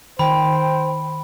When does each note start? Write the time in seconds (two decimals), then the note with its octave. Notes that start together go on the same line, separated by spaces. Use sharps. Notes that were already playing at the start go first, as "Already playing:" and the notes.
0.19 D#3 C5 G5 B5